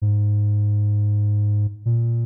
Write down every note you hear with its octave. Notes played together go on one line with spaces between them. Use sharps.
G#2
A#2